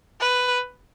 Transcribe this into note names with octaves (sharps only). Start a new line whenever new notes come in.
B4